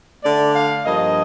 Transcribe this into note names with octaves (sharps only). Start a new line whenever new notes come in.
D3 A3 D5
F5
G2 F3 A#3 D#5